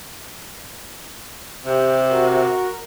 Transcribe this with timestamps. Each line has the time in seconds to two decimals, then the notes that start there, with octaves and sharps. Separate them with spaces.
1.65 C3 G4
2.11 F#4 A#4